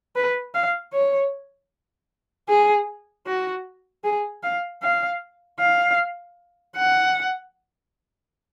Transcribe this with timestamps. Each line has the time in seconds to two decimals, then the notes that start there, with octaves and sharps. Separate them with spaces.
0.16 B4
0.54 F5
0.93 C#5
2.49 G#4
3.26 F#4
4.04 G#4
4.43 F5
4.83 F5
5.59 F5
6.76 F#5